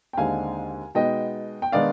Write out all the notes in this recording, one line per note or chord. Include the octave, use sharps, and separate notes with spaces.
G5
D#2 D3 G#3 C4 D#4 F5 G#5
B2 G#3 B3 D#4 D#5 G5
G5
D#3 G#3 B3 D4 D5 F5